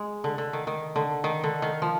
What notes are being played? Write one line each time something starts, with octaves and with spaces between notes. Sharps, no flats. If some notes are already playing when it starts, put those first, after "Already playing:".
Already playing: G#3
D3
D3
D#3
D#3
D3
D#3
D3
D#3
F3